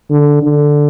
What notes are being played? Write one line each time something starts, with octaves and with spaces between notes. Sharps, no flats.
D3
D3